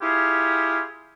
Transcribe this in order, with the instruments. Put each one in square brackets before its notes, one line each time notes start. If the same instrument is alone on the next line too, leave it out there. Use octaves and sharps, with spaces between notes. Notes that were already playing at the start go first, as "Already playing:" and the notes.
[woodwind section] E4 F4 G4 G#4